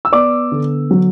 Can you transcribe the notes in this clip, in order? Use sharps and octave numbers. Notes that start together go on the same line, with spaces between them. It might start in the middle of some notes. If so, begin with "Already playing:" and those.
E6
B3 D5 D6
D3
F#3